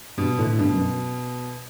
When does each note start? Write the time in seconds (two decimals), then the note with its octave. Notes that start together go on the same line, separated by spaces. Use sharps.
0.18 G2 B2
0.38 A2 D3
0.53 A2
0.59 G2 B2
0.74 F#2